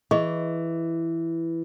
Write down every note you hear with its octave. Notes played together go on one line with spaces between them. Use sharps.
E3 G#4 D#5 C#6